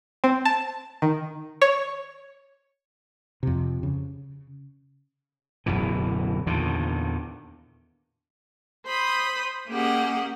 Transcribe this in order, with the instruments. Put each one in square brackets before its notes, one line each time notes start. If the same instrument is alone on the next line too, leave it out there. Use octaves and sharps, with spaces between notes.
[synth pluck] C4
A5
D#3
C#5
[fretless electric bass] F2 C3
C#3
[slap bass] D1 F#2 B2 E3
E2 A#2 D3 D#3
[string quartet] C5 B5 D#6
A#3 C#4 G4 G#4 D#5 F#5